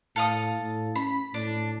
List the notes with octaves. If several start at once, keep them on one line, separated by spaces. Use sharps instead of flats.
A2 A4 F5 D#6
A2
C#4 B5
A2 D4